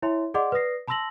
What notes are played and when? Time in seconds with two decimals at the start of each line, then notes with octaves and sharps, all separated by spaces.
0.02 E4 C#5 E5 G#5 C6
0.34 G#4 D5 D#5 F#5 C6 D6
0.52 B4 D5 D#6 A#6 C7
0.88 A5 B5 C6 E6 A#6 F#7